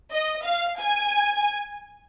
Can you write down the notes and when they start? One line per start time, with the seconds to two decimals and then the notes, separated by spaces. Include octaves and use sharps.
0.12 D#5
0.46 F5
0.80 G#5